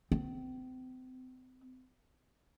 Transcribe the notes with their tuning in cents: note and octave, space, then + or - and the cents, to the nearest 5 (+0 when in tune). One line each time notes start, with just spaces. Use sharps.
C4 -35